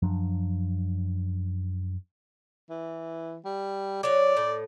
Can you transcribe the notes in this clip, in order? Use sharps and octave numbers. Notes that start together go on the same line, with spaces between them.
F#2 F3 F#3 D4
E3
G3
F#3 C#5 D5
A2